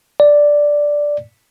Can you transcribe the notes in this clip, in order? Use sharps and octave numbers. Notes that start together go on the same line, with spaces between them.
D5